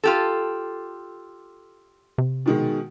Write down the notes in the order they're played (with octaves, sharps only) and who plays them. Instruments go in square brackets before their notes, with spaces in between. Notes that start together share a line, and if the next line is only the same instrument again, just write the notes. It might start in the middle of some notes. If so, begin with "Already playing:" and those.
[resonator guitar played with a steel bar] F4 G4 A4
[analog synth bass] C3
[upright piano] B2 D#3 G#3